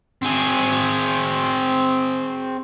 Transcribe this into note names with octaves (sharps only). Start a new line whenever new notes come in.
C4 G#4